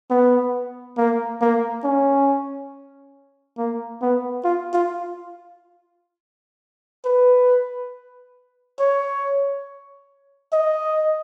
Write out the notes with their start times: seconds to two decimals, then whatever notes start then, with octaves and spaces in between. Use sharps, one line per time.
0.10 B3
0.97 A#3
1.41 A#3
1.84 C#4
3.58 A#3
4.02 B3
4.44 F4
4.73 F4
7.05 B4
8.80 C#5
10.53 D#5